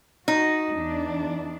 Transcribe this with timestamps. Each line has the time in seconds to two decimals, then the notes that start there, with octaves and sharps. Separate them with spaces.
0.28 D#4 F#4
0.74 E2 D4